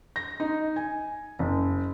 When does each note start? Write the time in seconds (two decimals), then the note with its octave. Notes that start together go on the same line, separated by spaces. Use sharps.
0.16 A#6
0.40 D#4
0.76 G#5
1.39 F#1